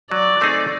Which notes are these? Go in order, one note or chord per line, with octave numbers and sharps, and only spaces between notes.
F#3 D5
A3 C4 D#4 G#4